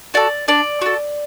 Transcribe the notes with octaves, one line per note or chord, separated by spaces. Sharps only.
F#4 A4 D5
D4 D5
F#4 A4